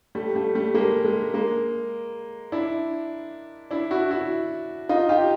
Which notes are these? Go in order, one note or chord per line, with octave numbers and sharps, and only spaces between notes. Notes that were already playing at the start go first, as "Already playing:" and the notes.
G3 A3
G3 A3
G3 A3
G#3 A#3
G#3
G#3 A#3
D4 E4
D4 E4
E4 F#4
E4 F#4
D#4 F4
F4 G4